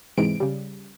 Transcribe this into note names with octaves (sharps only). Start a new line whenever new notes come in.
G#2 C3 E3 G#3 D7
C#3 G3